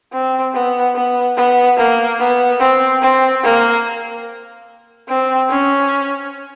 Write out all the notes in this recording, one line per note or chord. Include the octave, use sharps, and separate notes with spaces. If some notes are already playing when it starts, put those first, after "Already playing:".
C4
B3
B3
B3
A#3
B3
C4
C4
A#3
C4
C#4